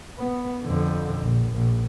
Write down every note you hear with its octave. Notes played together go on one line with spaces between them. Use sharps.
B3
F2 D3
A#1
A#1